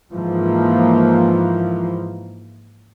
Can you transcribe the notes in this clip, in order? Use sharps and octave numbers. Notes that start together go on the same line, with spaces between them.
G#2 E3 F3 A#3